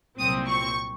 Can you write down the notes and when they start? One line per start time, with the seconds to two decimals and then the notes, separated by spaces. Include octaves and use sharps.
0.18 C2 A#2 F#3 C4 D#6
0.48 C#6